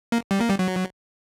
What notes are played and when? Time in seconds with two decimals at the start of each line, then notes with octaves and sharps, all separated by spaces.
0.12 A#3
0.31 G3
0.41 A#3
0.49 G3
0.59 F#3